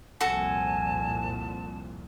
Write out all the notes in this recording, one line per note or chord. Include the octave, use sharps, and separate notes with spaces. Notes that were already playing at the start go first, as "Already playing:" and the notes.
C2 F2 A#2 F#4 A4 G#5 A5